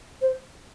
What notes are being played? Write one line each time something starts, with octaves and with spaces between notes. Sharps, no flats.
C5